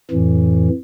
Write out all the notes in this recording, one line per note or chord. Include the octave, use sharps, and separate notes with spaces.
F2 A2 E3